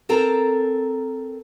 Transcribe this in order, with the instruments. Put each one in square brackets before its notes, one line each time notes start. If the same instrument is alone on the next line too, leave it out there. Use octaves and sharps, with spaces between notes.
[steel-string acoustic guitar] C4 A4 A#4 A5 A#5